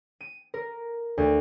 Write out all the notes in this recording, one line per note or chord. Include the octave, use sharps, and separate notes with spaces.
D#7
A#4
D2